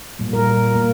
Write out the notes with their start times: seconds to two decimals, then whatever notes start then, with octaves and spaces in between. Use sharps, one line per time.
0.19 A#2 G3 A#3
0.33 A#4
0.76 A#3